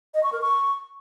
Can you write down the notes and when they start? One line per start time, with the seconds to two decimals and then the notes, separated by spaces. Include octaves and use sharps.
0.14 D#5
0.23 C#6
0.33 A#4
0.42 C#6